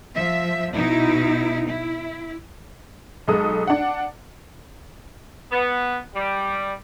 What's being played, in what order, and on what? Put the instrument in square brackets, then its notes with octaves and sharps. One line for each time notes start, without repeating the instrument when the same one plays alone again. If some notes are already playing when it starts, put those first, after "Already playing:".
[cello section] F3 E5
B2 D#4 E4
E4
[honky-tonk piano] B1 G#3 A4 D#6
D4 F#5
[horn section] B3
G3